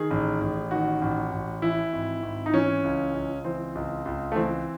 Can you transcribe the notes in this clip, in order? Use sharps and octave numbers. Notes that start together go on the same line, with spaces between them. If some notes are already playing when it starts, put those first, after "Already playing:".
Already playing: D#3 G#4
A1
A1
D#3 F#4
A1
A1
E3 E4
G#1
G#1
D#4
E3 C#4
C#2
C#2
E3 C4
C#2
C#2
A3
E3 C4